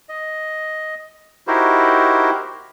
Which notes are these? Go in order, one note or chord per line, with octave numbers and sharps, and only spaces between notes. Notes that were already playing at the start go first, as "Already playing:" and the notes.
D#5
D#4 E4 F#4 G4 A#4 C5